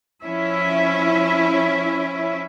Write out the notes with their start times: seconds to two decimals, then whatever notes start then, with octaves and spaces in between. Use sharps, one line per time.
0.23 F3 C#4 E4 E5